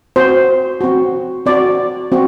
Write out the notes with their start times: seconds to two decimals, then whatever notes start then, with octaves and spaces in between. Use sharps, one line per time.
0.16 C4 F#4 C5
0.81 C4 F#4
1.46 C4 F#4 D5
2.12 C4 F#4